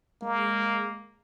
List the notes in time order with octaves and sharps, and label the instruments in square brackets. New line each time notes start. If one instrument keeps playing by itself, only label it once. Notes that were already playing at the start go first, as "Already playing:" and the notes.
[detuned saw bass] G#3 [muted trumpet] A#3